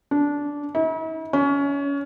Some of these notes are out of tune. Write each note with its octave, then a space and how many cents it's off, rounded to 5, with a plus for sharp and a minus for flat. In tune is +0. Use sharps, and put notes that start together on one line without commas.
D4 -15
E4 -45
C#4 +25